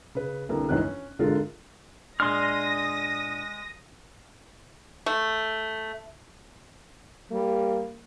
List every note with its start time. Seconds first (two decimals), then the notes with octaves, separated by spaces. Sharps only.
0.15 C#3 B4
0.49 C2 D3 A#3 B4
0.69 G1 C#2 D#3 E3 C#4 F#6
0.82 C#4
1.19 G#1 D3 G#3 F4 A#4
2.20 A#2 G#3 D4 C6 D#6 F6 A#6
5.06 A3
7.32 G3 A#3